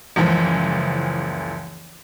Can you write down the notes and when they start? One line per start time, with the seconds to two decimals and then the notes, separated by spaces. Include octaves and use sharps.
0.16 F#1 C#2 E3 F3